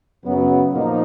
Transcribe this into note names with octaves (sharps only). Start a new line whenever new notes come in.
F#2 C#3 F#3 B3
A#2 F3 A#3 D#4